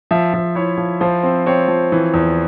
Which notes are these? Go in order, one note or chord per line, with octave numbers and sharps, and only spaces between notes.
F3 E5
F3
E4 C#5
F3
F3 C5
C4
C4 C#5
F3
E3
E2